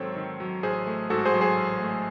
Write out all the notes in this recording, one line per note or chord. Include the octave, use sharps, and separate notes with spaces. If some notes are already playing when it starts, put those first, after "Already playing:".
Already playing: G#2 D#3 F#3 C4 A4 C5 C#5
D#3
F#3
A1 G#4 C5
A3
G#2 F#4 A4
G#4 C5
F#3
G#4 C5
A1
A3